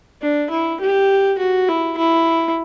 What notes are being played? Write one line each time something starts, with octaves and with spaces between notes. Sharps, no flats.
D4
E4
G4
F#4
E4
E4